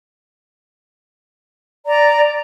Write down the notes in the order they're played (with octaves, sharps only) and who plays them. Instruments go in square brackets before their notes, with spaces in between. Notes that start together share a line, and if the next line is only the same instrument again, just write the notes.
[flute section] D5 A#5